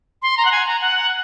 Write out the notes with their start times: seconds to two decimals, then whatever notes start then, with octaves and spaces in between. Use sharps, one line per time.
0.22 C6
0.37 A#5
0.45 F#5
0.52 G#5
0.66 A#5
0.81 F#5